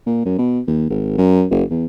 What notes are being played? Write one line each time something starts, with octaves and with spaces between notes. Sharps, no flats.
A#2
F#2
B2
D#2
G#1
F#2
F#1
E2